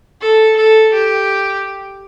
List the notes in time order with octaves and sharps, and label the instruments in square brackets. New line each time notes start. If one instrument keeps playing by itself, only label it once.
[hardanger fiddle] A4
A4
G4